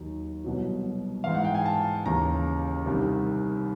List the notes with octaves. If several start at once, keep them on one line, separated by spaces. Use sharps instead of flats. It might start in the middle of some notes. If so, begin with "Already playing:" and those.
Already playing: D#2 D#3 F#3
C2 B2 F#3
G#2 E3 F5
F#5
G5
G#5
A5
D#2 C#3 E3 A#5
C2 C3 D#3